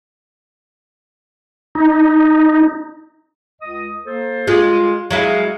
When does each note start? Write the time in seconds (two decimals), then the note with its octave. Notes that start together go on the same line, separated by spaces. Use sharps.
1.75 D#4
3.62 C#2 D#5 D#6
4.06 A#3 A4 C5
4.47 G#3 F4 G#4
5.11 F#3 G#3 E4 G#4 F5